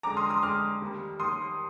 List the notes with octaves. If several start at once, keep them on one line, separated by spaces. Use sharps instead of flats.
F2 D3 G#3 A#5 D6
C6 D#6
C6 D#6
F2 D3 G#3 D6 F6
D#2 D#3 G3
D#2 D#3 G3 C6 D#6